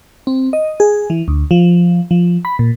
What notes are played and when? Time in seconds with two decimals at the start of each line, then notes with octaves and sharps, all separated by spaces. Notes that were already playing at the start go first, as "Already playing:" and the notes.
0.27 C4
0.53 D#5
0.80 G#4
1.10 E3
1.28 D2
1.51 F3
2.11 F3
2.45 B5
2.59 A#2